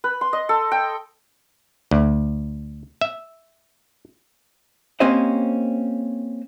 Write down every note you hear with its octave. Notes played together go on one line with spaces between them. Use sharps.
B4
C6
D#5
A4
G5
D2
E5
A#3 C4 C#4 G4 C5 D#5